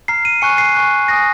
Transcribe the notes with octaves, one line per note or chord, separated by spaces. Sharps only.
A#5 F6 C7
D#7
G#5 C#6 F#6 C#7
C7
G#5 C#6 F#6
G#5 D#6 F#6 A#6